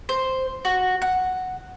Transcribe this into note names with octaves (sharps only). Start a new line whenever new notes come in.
C5
F#4
F#5